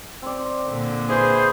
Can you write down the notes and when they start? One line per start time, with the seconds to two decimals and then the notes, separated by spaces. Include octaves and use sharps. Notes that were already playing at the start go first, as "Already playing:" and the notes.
0.22 C4 D5
0.69 A#2 D3
1.09 E3 G#4 B4 C5